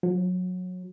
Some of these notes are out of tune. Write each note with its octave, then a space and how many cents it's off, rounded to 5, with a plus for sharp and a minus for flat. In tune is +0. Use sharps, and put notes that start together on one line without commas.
F#3 -25